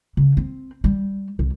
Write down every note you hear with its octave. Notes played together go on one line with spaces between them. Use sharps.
C#3
C4
G3
C2